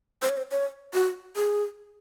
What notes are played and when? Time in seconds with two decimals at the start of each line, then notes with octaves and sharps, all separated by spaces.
0.22 C5
0.29 C#5
0.37 C5
0.51 C#5
0.94 F#4
1.36 G#4